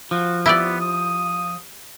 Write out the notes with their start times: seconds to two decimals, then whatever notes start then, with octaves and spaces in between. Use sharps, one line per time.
0.11 F3 F#4
0.46 B3 E4 G4 D5
0.80 D#6